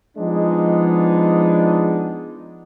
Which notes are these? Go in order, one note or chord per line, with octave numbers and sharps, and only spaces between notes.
F3 G#3 B3 D4 D#4